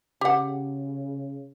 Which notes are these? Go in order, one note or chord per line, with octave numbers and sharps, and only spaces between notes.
C#3 G4 F#5